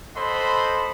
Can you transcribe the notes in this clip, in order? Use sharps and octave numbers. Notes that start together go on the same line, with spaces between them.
A4 C5 D#5 F#5 B5 C6